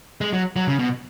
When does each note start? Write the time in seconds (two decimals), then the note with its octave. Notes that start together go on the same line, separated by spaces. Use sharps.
0.21 G#3
0.33 F#3
0.56 F#3
0.68 C#3
0.79 B2